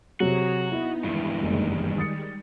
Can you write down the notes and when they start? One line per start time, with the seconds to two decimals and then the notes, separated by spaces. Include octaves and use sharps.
0.20 C3 F#3 F#4 G#4 A#5
0.72 B3 D#4 E4
1.04 E2 G2 D#3 G3 G#3 E4
1.43 F#1
1.98 D#6 A6 C#7